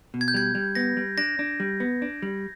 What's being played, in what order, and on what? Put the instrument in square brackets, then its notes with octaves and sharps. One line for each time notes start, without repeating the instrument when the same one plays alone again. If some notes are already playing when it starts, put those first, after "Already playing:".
[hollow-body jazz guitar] B2
[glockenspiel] G#6
G6
[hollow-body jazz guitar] G3 [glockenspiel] G#6
[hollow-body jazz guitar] G3
[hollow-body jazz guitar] B3 [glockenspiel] A#6
[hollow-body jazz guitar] G3
[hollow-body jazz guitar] D4 [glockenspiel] A#6
[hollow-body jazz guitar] D4
G3
B3
D4
G3